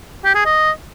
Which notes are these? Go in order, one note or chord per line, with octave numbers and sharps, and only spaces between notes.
G4
G#4
D#5